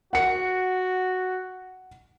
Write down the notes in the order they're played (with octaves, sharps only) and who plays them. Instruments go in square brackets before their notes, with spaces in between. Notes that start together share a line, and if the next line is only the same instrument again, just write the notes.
[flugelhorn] F#4 [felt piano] F#5 C#7